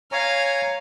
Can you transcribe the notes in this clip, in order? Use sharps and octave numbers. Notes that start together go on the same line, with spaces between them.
C#5 F5 G#5 A#5